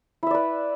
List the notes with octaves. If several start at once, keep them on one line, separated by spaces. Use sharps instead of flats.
E4 B4 D5 E5